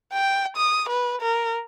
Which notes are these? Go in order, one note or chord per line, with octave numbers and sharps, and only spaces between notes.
G5
D#6
B4
A#4